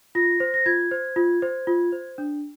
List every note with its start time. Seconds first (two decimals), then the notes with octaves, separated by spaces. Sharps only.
0.15 F4 A#6
0.40 C5
0.54 A#6
0.66 F4 G#6
0.91 C5
1.16 F4
1.42 C5
1.67 F4
1.92 C5
2.18 D4